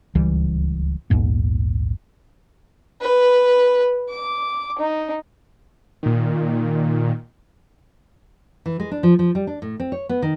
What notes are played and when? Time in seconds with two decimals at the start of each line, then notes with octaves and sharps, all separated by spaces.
0.15 D1 C#2 E3 G3
1.10 A#1 D#2 G#2 B3
3.02 B4
4.10 D6
4.79 D#4
6.03 A#2 D#3
8.66 E3
8.80 G#3
8.91 D4
9.03 F3
9.19 F3
9.35 G3
9.47 D4
9.62 A2
9.80 C4
9.92 C#5
10.09 B3
10.22 D#3